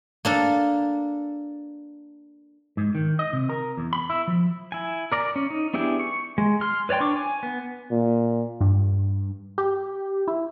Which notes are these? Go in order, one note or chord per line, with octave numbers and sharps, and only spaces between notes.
A#3 D4 A4
G#2
D#3
D#5
C3
A#4
E2
B5
E4
F3
E4 G#5
A#4 D5 A#5
C#4
D#4
B3 D4 E4 G4 G#4
C#6
G#3
C6 F6
B4 C#5 D5 G5 C6
D4 C#6 D6
G#5
B3
A#2
G2
G4
E4